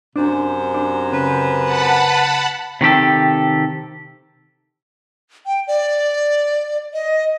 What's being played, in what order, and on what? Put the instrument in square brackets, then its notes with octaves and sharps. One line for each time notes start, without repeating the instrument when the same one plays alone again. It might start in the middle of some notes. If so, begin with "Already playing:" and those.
[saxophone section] F#2 C3 C5 [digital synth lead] D4
[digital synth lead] D4
[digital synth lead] C#3 [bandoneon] B4
[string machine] F#5 A5 B5
[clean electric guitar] C3 D#3 G4 A4
[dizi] G5
D5
D#5